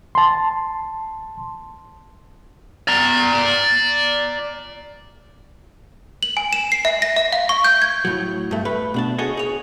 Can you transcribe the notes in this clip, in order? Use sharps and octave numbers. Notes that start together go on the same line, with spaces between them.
A5 C6
D5 A#5
F#7
G#5
E7
C7
E5
A#6
E5
F5
C#6
G6
G#6
A2 F#3
G2 A3
A3 B4
B2 D4 A5
F#4 G#4 A4 C#5 D#5 G#5
G#4 C#5